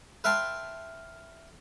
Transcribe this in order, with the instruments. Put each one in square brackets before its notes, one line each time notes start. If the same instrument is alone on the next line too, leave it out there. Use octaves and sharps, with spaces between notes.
[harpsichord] B4 E5 F5 G5 A5 C6